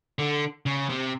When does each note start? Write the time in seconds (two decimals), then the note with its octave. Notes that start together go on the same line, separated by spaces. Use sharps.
0.19 D3
0.66 C#3
0.89 C3